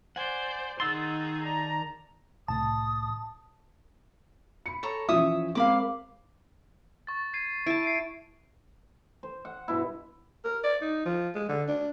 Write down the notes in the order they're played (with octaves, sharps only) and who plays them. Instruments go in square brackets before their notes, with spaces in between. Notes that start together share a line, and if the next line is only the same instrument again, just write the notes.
[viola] C5 D5 [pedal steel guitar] F#5 G#5
[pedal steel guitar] D#3 F#5 C6 [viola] D#4 G#4 [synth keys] E6 A6
[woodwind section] D5 A5 A#5
[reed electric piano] C2 A2 [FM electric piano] A5 [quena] D#6
[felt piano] B5 C#7
[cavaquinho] A4 C#5 A#5
[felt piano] E3 F3 C#4 [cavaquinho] C#5 E5 D#6
[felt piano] G#3 C4 A#4 [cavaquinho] F5 B5 D6
[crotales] C#6 A6
G#6 C7 D#7
[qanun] E4 A5 [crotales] D7
[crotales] C7 D7 D#7
[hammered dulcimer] C5
F#5
G2 B2 B3 E4
[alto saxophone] A#4
D5
D#4
F3
G#3
D3
D4